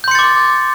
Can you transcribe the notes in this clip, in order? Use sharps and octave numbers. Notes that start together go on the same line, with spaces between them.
C6 D6 G6 A6 C#7